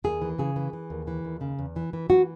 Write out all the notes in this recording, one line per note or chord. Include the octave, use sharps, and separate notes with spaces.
D#2 G#4
E3
C#3 G#4
E3
E3
D#2
E3
D#2
C#3
E2
E3
E3
E3 F#4